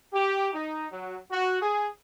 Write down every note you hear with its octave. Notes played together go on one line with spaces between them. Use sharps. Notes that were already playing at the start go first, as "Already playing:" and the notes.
G4
D#4
F#3
F#4
G#4